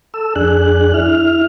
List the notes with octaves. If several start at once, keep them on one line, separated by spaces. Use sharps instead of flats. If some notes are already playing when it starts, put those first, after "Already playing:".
A4 E6
F2 D4 G#4 F#6
E4 F6